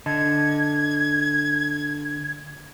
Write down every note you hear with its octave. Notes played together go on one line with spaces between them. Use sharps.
D3 D#5 A5 G#6